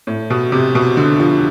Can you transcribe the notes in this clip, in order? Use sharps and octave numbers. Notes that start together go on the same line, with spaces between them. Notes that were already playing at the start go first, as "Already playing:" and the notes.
A2
B2
C3
B2
D3
F3